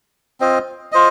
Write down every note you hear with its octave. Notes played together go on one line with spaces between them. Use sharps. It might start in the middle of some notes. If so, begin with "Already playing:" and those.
C4 F4 C5 D#5
F4 C5 D#5